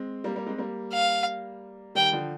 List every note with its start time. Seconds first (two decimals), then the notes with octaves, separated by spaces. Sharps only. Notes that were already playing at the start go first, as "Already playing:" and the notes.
Already playing: G#3 C4
0.24 G3 A#3
0.36 G3 A#3
0.47 G#3 C4
0.58 G3 A#3
0.93 F5
1.95 D#3 G3 G5
2.12 D3 F3